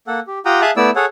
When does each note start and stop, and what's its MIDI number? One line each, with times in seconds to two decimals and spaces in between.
0.07 0.20 58
0.07 0.20 69
0.07 0.20 78
0.27 0.39 67
0.45 0.62 65
0.45 0.62 67
0.45 0.62 78
0.45 0.62 79
0.45 0.62 82
0.45 0.62 87
0.62 0.71 68
0.62 0.71 76
0.62 0.71 77
0.62 0.71 81
0.62 0.71 87
0.62 0.71 90
0.77 0.90 57
0.77 0.90 59
0.77 0.90 64
0.77 0.90 74
0.77 0.90 88
0.96 1.05 68
0.96 1.05 69
0.96 1.05 73
0.96 1.05 78